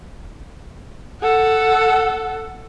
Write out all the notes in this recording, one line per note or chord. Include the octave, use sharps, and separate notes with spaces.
A4 F#5